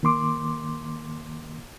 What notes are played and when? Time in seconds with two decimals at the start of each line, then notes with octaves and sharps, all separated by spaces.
0.03 D#3 A#3 C6 D6